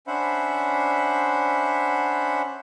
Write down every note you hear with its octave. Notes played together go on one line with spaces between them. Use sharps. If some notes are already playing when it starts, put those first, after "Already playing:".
C#4 D4 C5 E5 F#5 B5